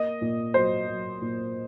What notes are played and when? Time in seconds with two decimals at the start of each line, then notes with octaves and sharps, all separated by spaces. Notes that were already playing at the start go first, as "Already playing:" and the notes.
Already playing: A#3 D#5
0.21 A#2
0.54 F#3 C5
0.88 F#3
1.21 A#2